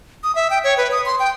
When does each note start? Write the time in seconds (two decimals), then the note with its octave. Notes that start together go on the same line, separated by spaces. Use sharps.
0.24 D#6
0.35 E5
0.50 G5
0.64 C#5
0.77 B4
0.92 D#6
1.06 C6
1.19 G5